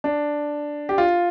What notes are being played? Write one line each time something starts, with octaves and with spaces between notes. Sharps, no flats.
D4
G4
F4